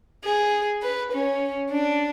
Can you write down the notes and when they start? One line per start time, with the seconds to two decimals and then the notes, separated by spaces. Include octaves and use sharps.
0.24 G#4
0.83 B4
1.12 C#4
1.70 D4